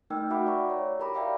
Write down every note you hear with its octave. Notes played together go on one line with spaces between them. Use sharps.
A3 D#4 A#4 G5 E6 F6
F#4 E5 F#5 G5 B5 D6
D5 A#5 C#6
C#5
E4 G4 A#4 A#5 B5 D6
D5 E5 F5 G5 B5 D6